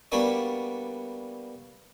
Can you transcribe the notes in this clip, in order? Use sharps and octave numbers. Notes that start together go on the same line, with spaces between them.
G3 A#3 B3 D4 F#4 D5